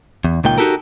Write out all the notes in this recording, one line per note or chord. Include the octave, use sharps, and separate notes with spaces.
E2
C#2 A#2 D#3 G5
D#4 F#4 G4 A4 A#4